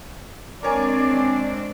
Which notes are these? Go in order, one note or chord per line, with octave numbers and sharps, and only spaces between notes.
G#3 C4 D4 A#4 C#5 D5 G#5